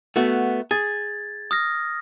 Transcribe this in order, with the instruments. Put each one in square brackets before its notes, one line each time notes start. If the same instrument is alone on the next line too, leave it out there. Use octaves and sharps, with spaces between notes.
[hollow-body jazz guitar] A3 B3 F#4
[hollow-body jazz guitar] G#4 [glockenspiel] G#6 A6
[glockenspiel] D#6 F6 A#6